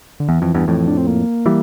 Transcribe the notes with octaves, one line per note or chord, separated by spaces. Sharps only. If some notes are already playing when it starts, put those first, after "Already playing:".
D3
E2 E3
F2
E2 G2
F2 A2
D4
C4
A#3
E3 G3